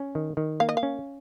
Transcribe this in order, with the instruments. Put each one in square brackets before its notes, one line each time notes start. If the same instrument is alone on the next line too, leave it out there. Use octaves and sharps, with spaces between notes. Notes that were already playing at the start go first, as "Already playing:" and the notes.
Already playing: [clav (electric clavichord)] C#4
D#3
D#3
[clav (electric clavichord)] A#3 [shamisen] F5
[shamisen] D#5
F5
[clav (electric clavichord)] C#4